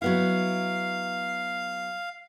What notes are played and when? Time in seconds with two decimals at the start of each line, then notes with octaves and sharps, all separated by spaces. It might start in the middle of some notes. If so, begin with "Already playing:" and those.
0.02 F#3 B3 E4 F5